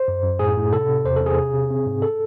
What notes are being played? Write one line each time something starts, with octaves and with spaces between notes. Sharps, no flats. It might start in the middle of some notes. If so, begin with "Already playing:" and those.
Already playing: C5
F#2
F#2
A2 G#4
A2
C3 A4
C3
E2 C5
E2 A4
G#4
C3
C3
C4
G#2
A4